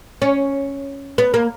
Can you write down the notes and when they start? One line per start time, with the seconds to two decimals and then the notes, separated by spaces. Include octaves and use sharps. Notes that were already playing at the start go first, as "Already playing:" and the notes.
0.22 C#4
1.18 B3
1.34 A#3